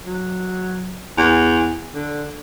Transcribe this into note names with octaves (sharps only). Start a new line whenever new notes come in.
F#3
E2
D3